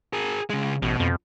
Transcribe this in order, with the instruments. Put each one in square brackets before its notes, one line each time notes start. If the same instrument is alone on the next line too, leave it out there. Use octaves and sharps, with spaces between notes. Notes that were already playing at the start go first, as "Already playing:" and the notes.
[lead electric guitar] G#4 A#4
C#3 G#3
[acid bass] A1 [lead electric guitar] B2
[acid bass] F2